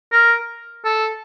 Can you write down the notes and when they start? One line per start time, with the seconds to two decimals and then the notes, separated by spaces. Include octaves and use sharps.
0.12 A#4
0.85 A4